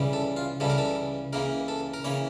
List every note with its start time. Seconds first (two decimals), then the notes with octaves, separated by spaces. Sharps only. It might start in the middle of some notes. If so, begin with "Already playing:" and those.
Already playing: C#2 C#3 E3 G3
0.13 A4
0.36 F4
0.60 C#2 C#3 E3 G3 A4
0.70 A#4
0.78 A4
1.33 C#2 C#3 E3 A#3 A#4
1.68 A4
1.94 A#4
2.04 C#3 E3 A#3 C#5